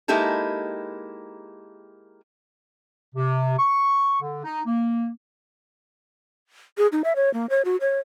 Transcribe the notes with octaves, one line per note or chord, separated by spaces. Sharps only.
G#3 A#3 D#4 E4 G4 A4
C3
C#6
D3
D#4
A#3
G#4
D#4
E5
C#5
A#3
C#5
F#4
C#5